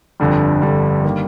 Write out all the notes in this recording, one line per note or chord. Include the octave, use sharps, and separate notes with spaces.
G1 F2 D3 G3
G1 F2 D3 G3
D#3 G3 A#3